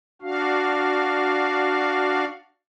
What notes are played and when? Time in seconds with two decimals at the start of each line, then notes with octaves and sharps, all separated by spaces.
0.22 D4 F#4 F5